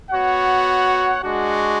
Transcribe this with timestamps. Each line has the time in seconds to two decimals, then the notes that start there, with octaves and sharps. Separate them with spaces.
0.10 B3 F#4 C#5 F#5
1.22 G#3 D4 F#4